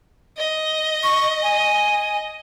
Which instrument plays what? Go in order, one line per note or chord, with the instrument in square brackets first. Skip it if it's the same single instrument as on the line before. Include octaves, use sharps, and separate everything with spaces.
[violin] D#5
[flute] C#6
G#5